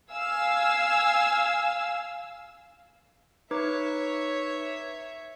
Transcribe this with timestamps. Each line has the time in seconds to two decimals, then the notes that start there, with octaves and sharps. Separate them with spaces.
0.12 F5 G#5 E6
3.51 D#4 B4 C#5 E5 D6